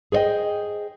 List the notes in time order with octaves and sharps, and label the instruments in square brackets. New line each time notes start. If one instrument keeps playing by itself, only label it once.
[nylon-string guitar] G#4 C5 C#5 D#5 G5